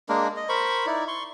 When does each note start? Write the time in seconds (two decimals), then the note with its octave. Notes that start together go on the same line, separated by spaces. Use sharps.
0.09 G#3 A#3 D4 A#4
0.37 D#5
0.49 A#4 C5 B5 C#6
0.86 D#4 E4 D5
1.08 C6 C#6